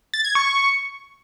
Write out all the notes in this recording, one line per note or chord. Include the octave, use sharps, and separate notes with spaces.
A6
G#6
C#6